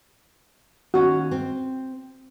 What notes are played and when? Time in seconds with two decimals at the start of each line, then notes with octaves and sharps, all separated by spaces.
0.94 D#2 A#3 C#4 F#4
1.31 C4